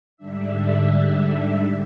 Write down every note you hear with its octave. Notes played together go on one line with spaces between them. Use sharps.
G#2 D3 G3 D4 E5